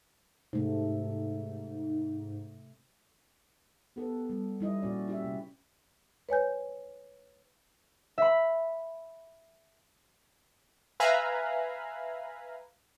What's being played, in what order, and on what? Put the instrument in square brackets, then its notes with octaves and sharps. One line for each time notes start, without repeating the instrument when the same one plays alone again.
[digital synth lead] G#2 [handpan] C3 A3
[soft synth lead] B3 [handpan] G4 A4 B4
[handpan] G3
G3 E4 D#5
[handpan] A#2 F#4 D5 [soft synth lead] C#4
[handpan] E4 G4 E5
C3 A3
[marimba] B4 C#5 G#5 G6
[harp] E5 B5
[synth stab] B4 E5 F5 G#5 A#5 B5